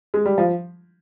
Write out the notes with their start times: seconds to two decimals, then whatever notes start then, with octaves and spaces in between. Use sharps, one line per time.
0.14 G#3
0.26 G3
0.38 F3